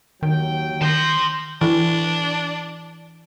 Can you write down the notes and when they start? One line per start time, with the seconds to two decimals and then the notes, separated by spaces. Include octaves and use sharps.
0.23 D#2 D#3 F#3 G5
0.82 D#3 A5 C6 G6 A#6
1.61 E3 D4 A4